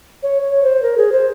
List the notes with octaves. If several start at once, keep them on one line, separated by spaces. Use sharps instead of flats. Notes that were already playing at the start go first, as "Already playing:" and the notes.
C#5
C#5
C5
A#4
G#4
C5